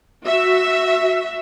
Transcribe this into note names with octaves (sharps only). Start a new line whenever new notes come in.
F#4 E5